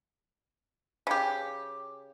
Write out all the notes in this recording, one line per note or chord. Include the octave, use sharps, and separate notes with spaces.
C#3 G4